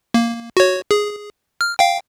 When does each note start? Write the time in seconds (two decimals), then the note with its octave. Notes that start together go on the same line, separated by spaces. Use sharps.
0.14 A#3
0.57 F#4 C#5
0.91 G#4
1.61 F6
1.79 F5 G5